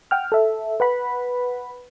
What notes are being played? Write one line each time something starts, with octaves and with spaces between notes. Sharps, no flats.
F#5 G5 F6
A4 E5
B4 F#5 B5